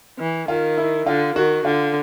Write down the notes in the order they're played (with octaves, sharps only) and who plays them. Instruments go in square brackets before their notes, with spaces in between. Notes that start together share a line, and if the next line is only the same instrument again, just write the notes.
[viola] E3
[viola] D#3 [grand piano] F4
[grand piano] E4
[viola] D3 [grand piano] F4
[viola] D#3 [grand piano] F#4
[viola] D3 [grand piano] F4